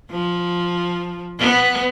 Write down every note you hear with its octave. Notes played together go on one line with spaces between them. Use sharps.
F3
B3